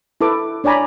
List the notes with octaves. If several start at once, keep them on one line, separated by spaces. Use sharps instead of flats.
E4 A4 B4 D6
D4 C#5 D5 G#5 A#5 B5